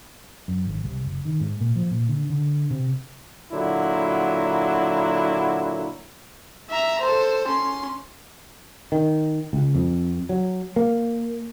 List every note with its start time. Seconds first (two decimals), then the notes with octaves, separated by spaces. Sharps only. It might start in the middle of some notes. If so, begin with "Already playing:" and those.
0.48 F#2
0.65 G#1
0.84 C2
1.05 F#1
1.25 D#3
1.40 G#2
1.61 A#2
1.76 F3
1.91 A#2
2.09 D3
2.30 D3
2.70 C3
3.52 A#2 D3 F#3 E4
6.70 E5 A#5
7.01 A4 C5
7.48 C#4 C6
8.92 D#3
9.53 C#2
9.75 F2
10.29 F#3
10.76 A#3